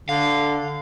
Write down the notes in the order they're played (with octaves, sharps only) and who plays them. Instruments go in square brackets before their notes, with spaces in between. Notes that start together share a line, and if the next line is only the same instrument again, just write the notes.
[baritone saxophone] D3 [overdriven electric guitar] F5